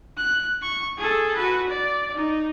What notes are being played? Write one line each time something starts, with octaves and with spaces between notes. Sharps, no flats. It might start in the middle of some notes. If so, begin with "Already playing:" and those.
F#6
C#6
G#4 A4
F#4 B4
D5
D#4